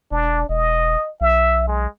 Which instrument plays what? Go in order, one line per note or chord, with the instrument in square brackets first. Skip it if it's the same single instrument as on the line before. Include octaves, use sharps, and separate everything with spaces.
[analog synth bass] E1 [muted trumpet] D4
[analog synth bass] E1 [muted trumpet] D#5
[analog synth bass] B1 [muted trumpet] E5
[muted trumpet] G#3